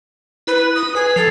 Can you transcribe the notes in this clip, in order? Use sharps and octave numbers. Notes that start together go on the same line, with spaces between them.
E4 B4
D#6
G#4 B4
F3 A4